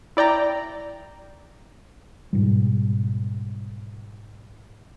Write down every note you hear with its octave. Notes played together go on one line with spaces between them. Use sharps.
E4 D5 G5 A#5
G#2 B2 G3